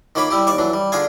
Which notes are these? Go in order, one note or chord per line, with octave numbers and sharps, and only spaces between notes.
D#3 A#3 F4 C#5 B5 D6
G3 E4 G4
D#2 D5 C#6 D6
E3 F#3 D4
G3
D3 D4 F4 G#4 F5 G#5